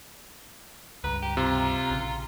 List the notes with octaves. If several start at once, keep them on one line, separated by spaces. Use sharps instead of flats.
C#2 G2 B4 A#5
G4
C3 F4
A#1 C#3